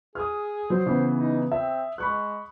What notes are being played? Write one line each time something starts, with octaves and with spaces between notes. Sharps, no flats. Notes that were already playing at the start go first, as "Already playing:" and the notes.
G#4 D#6 F6
F#3 C5
C#3 E3 B3
D#4
C4 E5
G#3 B5 C#6 F#6